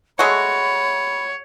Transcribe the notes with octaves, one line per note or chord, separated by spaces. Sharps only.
G#3 A3 F#4 C#5 B5